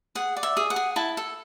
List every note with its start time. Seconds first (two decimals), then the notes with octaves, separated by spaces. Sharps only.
0.15 G#4 F#5
0.37 D5
0.43 E5
0.57 G#4
0.70 F#5
0.76 G#4
0.96 E4 A5
1.17 A4